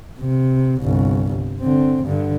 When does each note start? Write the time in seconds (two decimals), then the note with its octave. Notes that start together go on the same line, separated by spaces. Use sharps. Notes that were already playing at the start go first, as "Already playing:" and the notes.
0.19 C3
0.82 G1 C2
1.60 D3 C4
2.05 G2 D3